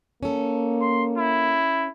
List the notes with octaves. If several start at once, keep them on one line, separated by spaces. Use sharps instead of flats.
A#3 C#4 A4
C6
E4